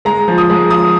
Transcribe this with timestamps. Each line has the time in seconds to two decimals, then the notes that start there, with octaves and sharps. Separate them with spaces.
0.05 G#3 A#5
0.28 F3
0.38 D#6
0.50 G#3
0.70 F3 D#6